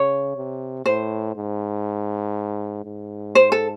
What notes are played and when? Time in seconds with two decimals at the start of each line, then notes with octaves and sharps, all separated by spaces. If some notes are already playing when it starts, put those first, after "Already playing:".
Already playing: C#3 C#5
0.36 C3
0.86 A2 C5
1.36 G#2
2.85 G#2
3.35 C5
3.52 A4